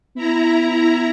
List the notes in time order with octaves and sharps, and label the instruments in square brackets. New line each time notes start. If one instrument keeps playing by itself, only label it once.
[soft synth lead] B3 [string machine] E4 A#5